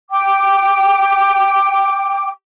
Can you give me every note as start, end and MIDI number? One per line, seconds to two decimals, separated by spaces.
0.11 2.28 79
0.11 2.28 86